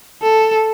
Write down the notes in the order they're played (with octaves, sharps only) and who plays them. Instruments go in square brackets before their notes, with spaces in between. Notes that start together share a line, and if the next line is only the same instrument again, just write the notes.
[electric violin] A4